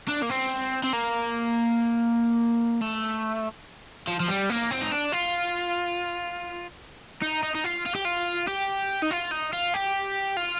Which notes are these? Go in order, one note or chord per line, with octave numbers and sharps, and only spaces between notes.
D4
A#3
C4
C4
A#3
A3
F3
F3
G3
A#3
C4
D#4
D4
F4
D#4
D#4
D#4
F4
F4
G4
F4
G4
D#4
F4
D#4
F4
G4
F4